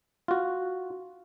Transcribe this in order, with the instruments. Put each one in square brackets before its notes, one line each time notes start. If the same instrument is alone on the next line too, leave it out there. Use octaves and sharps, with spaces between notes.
[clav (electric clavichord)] F4 F#4